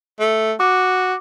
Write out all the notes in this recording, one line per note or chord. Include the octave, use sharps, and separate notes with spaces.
A3
F#4 D6